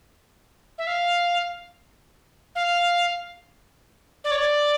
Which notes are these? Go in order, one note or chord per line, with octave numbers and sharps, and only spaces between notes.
E5
F5
F5
D5
C#5
D5